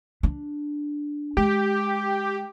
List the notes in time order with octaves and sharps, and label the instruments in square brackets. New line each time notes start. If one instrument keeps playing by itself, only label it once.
[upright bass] D4
[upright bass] G#3 [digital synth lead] G4